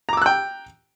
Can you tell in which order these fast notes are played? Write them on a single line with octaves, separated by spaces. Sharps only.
A#5 D6 E6 F#6 G5